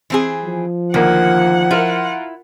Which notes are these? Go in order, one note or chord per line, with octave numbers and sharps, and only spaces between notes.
E3 C4 G#4
F3
D2 D#3 A#3 F#5
E4 F4 A#4